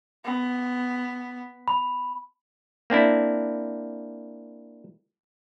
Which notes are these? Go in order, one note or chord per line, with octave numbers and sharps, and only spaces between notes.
B3
B5
A#3 C4 D4 E4